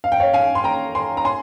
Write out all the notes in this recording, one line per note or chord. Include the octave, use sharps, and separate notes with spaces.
F5
G5
C#5 F5
F5 G#5
C6
G5 A#5
G#5 C6
A#5
G#5 C6